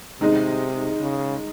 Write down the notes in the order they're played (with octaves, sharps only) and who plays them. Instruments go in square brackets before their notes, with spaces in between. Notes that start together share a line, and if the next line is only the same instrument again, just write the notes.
[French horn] C3 [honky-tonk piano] D#3 G#3 D#4
[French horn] C#3